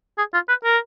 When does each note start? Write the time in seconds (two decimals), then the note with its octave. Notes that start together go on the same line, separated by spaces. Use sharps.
0.18 G#4
0.34 F4
0.49 B4
0.64 A#4